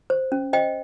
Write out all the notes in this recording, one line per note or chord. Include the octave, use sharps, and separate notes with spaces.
C5
C#4
C5 D#5 G5